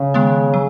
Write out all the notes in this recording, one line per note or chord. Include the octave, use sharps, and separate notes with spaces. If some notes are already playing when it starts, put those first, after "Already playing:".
Already playing: C#3
D#3 G#3 B3
F#3